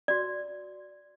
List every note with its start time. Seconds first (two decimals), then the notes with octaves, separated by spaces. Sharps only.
0.08 F#4 D5